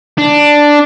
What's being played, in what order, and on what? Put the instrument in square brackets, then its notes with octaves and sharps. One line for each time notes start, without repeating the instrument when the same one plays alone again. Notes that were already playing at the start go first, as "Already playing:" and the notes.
[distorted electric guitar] D4